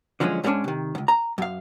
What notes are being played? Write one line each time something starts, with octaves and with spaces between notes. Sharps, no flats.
D3 F3 F#3 G#3 C#4
G#2 G3 G#3 A#3 C#4 D4
C3 D#3
C#2 G#2
A#5
F#2 F5